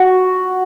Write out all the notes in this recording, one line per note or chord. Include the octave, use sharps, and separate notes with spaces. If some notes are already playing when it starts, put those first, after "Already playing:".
Already playing: F#4